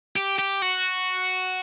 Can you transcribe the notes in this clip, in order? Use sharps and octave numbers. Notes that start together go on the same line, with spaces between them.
G4
G4
F#4